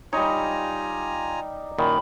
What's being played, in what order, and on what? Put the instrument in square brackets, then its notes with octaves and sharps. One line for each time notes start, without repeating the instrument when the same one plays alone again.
[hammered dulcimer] G3 D#4 [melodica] F4 G#5 A#5 [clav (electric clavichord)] C#5
[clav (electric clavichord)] F#2 A#2 D#3 [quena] B5